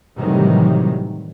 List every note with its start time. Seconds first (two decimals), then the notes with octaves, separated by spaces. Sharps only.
0.18 A2 C3 D#3 E3 F#3 G3